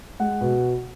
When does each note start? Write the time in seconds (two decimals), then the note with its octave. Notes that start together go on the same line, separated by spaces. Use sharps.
0.19 G#3 F#5
0.41 B2